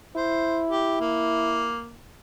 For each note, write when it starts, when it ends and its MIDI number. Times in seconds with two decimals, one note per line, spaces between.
0.16 1.77 64
0.16 0.64 72
0.70 0.98 67
1.01 1.99 58